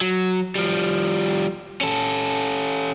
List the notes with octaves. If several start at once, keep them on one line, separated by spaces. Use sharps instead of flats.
F#3
F3 G3
C#4 A4